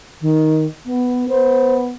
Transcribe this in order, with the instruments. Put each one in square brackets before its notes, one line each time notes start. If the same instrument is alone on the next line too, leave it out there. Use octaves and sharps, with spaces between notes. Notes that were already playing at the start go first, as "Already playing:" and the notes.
[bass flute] D#3
B3
[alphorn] B3 [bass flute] C5